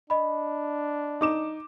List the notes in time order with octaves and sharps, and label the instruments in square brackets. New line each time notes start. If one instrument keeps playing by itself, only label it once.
[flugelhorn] D4 [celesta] D#5 B5
[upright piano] D#4 D6 E7